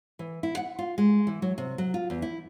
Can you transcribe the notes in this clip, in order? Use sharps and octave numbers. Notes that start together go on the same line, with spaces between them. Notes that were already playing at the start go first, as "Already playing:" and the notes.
E3
E4
F#5
F4
G#3
E3
F#3
C3
F#3
F4
E2
E4